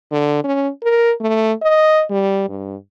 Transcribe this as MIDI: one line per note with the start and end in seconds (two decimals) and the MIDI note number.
0.11 0.40 50
0.44 0.68 61
0.82 1.12 70
1.20 1.52 57
1.62 2.03 75
2.10 2.46 55
2.49 2.76 43